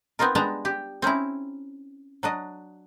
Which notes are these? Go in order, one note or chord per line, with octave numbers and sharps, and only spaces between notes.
B3 C4 D#4 F4 A#4
G3 G#3 B3 D4 A5 A#5
G4
C4 C#4 D#4 E4
F#3 D4 D#5